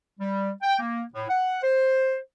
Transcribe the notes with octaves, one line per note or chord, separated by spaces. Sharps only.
G3
G5
A#3
A2
F#5
C5